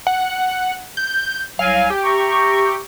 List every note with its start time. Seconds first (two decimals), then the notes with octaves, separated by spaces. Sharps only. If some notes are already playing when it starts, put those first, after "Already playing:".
0.07 F#5
0.97 G6
1.59 C2 F#3 F5 G#5
1.90 G4
2.03 E5 A#5 C#6